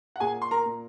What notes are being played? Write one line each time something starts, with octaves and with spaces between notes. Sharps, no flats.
F#5
A#2 G#4 G#5
C6
A#4 A#5
A#2